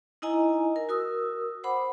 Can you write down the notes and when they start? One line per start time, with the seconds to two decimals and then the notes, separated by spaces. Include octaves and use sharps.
0.22 D#4 E4 D#5 G#5 A#5
0.76 A#4
0.89 F#4 A#4 D#6 E6
1.64 C5 F#5 B5 D6